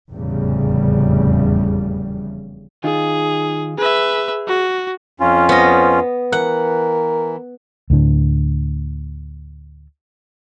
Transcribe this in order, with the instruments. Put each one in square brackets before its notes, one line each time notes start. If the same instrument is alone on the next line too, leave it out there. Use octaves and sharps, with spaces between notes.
[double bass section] F1 E2 A2 C#3 G3
[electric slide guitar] D#3 D#4 F4 [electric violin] G#4
[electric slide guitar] G#4 [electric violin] B4 E5
[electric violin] F#4
[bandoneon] F2 C#4 F4
[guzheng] B3 D#5 [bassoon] C5
[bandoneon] E3 [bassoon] A#4 [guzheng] F#5
[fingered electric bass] D2 A2 D3